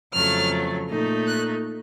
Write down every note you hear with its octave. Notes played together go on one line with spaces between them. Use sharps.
F2 C#3 F#3 A3 F6
A#2 A3 D#4
F#6